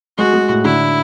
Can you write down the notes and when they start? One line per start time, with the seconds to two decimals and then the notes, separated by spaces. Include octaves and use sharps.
0.18 G#3 F#4
0.34 G#3
0.49 A2
0.64 D3 E4